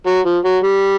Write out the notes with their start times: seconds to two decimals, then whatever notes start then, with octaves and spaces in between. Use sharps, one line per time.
0.06 F#3
0.25 F3
0.45 F#3
0.63 G3